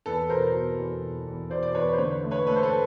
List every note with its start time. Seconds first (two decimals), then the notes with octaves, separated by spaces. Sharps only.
0.06 E2 A4 B4
0.29 B2 A#4 C5
0.54 B2
0.78 E2
1.02 B2
1.27 E2
1.50 B2 C5 D5
1.63 D5
1.75 E2 B4 C#5
1.93 C5
1.98 D3 B4 C#5
2.24 A3
2.31 B4 C#5
2.47 A3 A4 B4
2.56 C5
2.63 A4 B4